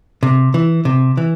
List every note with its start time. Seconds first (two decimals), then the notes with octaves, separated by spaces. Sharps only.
0.23 C3
0.54 E3
0.85 C3
1.17 E3